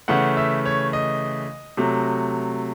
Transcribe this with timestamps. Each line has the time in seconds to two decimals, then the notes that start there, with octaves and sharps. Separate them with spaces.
0.08 C#3 E3 A3 F#5
0.37 E5
0.66 C#5
0.93 D#5
1.77 C3 F#3 A3